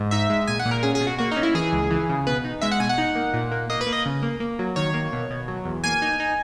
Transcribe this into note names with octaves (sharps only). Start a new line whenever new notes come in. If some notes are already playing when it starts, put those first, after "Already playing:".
Already playing: G#2
D#4 E5
G#3
A#2 G#5
F#5
A#2
A#4
C#4 G#4
G#4
B2
F#4
A#3 F#4
C#4 D#4
E4
E3 G#4
C#2
E3
C#3
B2 B4
D#4
G#3 E5
F#5
B2 G#5
F#5
D#4
A#3
A#2
A#3
A#3 D#5
B4
A#3
D#5
C#3
A#3
A#3
F#3
D#3 C#5
A#3
B2
B2
F#3
E2
A#3 G#5
D#4
D#4